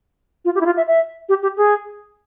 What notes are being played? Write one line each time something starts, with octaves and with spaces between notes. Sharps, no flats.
F4
G4
E4
F4
E5
E5
G4
G4
G#4